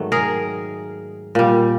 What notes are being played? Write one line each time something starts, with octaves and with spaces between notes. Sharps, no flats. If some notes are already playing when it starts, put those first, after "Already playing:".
Already playing: G#2 D#3 F#3 A3
G#4 A#4
A#2 G3